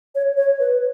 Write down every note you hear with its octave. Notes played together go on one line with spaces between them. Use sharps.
C#5
C#5
B4